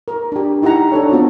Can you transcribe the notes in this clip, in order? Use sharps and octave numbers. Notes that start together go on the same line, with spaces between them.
A#4
D4 G4
D#4 E4 G4 F#5 A#5
D4 A4 C#5
B3 C4 F4 F#4